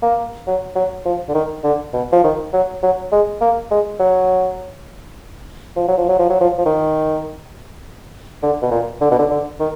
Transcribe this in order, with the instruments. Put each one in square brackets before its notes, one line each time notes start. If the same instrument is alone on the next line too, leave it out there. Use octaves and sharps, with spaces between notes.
[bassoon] A#3
F#3
F#3
F3
D3
D#3
D3
B2
F3
D#3
F#3
F#3
G#3
A#3
G#3
F#3
F3
F#3
F3
F#3
F3
F#3
F3
F3
D#3
D3
B2
A#2
D3
B2
D3
D3
D#3